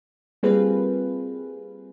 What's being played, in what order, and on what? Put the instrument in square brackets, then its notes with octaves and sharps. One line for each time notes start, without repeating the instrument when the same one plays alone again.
[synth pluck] G3 A#3 C4 F4 G#4 B4